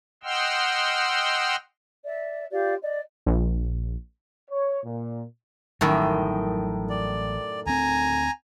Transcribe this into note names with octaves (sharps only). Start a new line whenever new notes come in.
D#5 F#5 G5 C6 E6 F6
D5 E5
F4 G4 D5 F5
D5 D#5
A#1
C#5
A#2
A1 F#2 A2 D#3 F#3 G3
D5
D2 C4 G#5 A#5